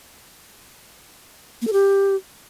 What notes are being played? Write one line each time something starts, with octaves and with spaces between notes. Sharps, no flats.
A#3
A4
G4